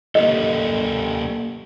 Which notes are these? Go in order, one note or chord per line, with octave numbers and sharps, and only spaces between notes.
A#3 G4 A4 D#5